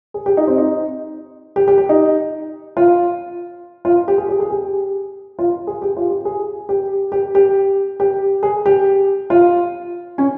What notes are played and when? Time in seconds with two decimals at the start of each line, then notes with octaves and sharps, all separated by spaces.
0.14 G#4
0.26 G4
0.37 D#4
0.47 C4
0.58 D#4
1.56 G4
1.68 G4
1.78 G4
1.89 D#4
2.77 F4
3.85 F4
4.08 G4
4.18 G#4
4.28 G#4
4.40 G#4
4.50 G4
5.39 F4
5.67 G#4
5.82 G4
5.97 F4
6.10 G4
6.25 G#4
6.69 G4
7.12 G4
7.35 G4
8.00 G4
8.43 G#4
8.66 G4
9.30 F4
10.18 C#4